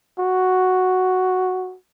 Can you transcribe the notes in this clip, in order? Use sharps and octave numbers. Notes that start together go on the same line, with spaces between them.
F#4